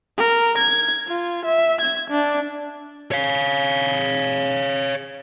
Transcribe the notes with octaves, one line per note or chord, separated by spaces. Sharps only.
A#4
G#6
F4
E5
G#6
D4
C#5 F5